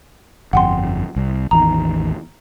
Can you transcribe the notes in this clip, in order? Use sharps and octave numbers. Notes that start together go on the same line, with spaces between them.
G1 F2 F#5 G5 C6
C2
A1 E2 D#3 A#5